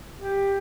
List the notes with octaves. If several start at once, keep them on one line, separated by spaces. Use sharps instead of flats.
G4